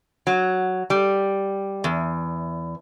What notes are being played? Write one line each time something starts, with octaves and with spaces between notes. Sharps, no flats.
F#3
G3
E2